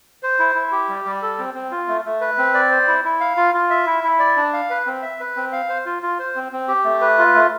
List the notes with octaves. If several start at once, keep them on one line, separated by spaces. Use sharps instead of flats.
C5
E4
E4
G4
G3
G3
A4
C4
C4
F4
A3
A3
B4
C4
D5
C5
E4
E4
F5
F4
F4
E5
E4
E4
D5
D4
F5
B4
C4
E5
B4
C4
F5
C5
F4
F4
C5
C4
C4
G4
A3
B4
F4
A3